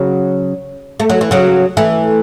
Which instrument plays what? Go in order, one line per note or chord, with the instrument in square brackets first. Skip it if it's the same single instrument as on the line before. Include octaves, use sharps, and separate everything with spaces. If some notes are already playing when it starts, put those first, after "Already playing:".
Already playing: [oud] C#3 F#3
A3
F#3
E3
C#3 F#3
E3 A3